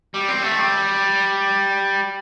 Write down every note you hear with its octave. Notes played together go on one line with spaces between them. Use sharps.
G3
C4
A3
G3